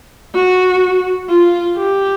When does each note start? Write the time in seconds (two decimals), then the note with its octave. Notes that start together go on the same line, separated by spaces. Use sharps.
0.35 F#4
1.29 F4
1.77 G4